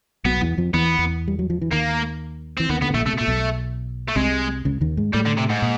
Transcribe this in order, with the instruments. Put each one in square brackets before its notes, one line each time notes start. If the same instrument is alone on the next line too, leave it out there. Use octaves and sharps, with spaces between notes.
[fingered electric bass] B1 B2 [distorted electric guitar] B3
[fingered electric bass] E2 E3
F2 F3
[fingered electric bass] E2 E3 [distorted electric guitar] B3
[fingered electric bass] E2 E3
G3
F#3
F3
E3
[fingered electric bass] D#2 D#3 [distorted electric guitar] A#3
[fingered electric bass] E3 [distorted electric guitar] C4
[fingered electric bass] D#2 D#3 [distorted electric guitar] B3
[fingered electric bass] D2 D3 [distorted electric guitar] B3
[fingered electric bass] A2
[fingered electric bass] A#1 A#2 [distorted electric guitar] A3
[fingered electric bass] C3 [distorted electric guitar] A3
[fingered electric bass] B2
[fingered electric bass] A#2 [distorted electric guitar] A3
[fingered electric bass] B1 B2
[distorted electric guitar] A3
[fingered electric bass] C2 C3 [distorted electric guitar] G#3
[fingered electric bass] C#2 C#3
D#2 D#3
G#2 G#3
[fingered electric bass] A2 A3 [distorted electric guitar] G3
[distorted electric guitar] D3
C3
G#2
[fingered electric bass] A#2